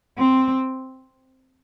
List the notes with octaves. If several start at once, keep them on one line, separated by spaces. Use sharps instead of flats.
C4